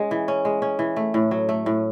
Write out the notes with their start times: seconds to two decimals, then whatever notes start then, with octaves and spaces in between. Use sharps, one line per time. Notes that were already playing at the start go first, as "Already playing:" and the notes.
Already playing: G#3 C#4
0.11 E3
0.28 C#4
0.45 G#3
0.62 C#4
0.79 E3
0.96 A3
1.14 A2
1.31 F#3
1.49 A3
1.66 A2